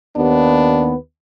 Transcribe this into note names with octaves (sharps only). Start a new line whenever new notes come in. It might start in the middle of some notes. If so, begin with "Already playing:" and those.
D#2 B3 D4